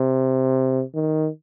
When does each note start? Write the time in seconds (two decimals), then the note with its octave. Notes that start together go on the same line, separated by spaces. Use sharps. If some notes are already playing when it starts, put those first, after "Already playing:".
Already playing: C3
0.95 D#3